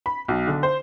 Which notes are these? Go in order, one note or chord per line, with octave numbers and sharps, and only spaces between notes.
B5
B1
D3
C5